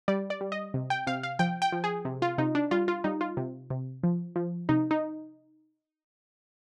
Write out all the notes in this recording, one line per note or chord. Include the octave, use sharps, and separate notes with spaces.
G3 D5
D5
G3
D#5
C3
G5
C3 F5
F5
F3 G5
G5
F3
G#4
C3
F4
C3 D#4
D4
G3 F4
F4
G3 D#4
F4
C3
C3
F3
F3
C3 D#4
D#4